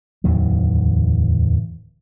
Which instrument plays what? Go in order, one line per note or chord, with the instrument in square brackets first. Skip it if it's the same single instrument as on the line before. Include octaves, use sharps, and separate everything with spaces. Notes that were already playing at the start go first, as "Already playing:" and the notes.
[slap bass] D1 E2 D#3 F#3